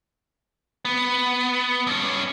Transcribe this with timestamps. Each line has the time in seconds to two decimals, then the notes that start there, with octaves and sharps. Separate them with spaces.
0.85 B3
1.87 G2 C#4